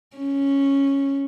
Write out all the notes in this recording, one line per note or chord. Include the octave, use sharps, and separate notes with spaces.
C#4